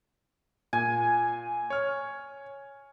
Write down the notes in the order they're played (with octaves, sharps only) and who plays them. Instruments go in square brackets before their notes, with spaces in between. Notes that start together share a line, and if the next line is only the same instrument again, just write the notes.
[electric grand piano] A#2 [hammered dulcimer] G#5
[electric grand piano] C#5 F6